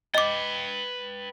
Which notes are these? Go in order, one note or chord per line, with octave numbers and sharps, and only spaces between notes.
B4 D#5 G5 D6